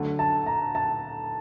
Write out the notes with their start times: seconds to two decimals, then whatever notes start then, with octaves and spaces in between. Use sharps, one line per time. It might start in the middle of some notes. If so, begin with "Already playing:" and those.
Already playing: D2 D3 F#3 A3 D4
0.19 A5
0.46 A#5
0.75 A5